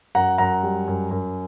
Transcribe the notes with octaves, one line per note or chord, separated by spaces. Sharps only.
F#2 F#5 A#5
F#2 F#5 A#5
G3
F#2
F#2